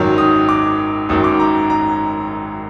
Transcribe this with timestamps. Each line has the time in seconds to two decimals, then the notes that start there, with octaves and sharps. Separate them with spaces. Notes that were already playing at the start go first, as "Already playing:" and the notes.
Already playing: G#1 F#2 D#3 F#3
0.18 D#6
0.49 D6
1.09 G#1 F#2 D#3 F#3 D#6
1.24 D6
1.40 A#5
1.70 A#5